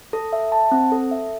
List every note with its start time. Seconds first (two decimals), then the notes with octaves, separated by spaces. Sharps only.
0.13 A4
0.33 E5
0.52 A5
0.72 C4
0.92 A4
1.11 E5